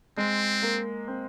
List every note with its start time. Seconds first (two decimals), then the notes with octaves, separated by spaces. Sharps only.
0.17 G#3 C4
0.63 A#3
1.08 C4